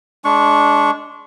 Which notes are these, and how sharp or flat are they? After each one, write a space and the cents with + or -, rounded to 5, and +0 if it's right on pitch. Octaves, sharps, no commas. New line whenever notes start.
G#3 +5 D4 -15 C#6 +0